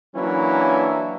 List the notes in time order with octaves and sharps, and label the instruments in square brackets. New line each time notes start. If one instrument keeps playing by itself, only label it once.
[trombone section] E3 F#3 A#3 C#4 D4 E4